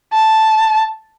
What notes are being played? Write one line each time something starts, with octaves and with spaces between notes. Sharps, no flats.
A5